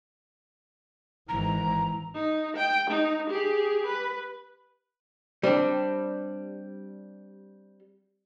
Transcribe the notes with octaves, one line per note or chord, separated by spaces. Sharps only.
G#1 E3 A#5
D#4
G5
D#4
G4 G#4
B4
G3 C4 D4